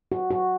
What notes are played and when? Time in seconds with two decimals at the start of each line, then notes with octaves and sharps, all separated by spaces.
0.12 F#4
0.31 F#4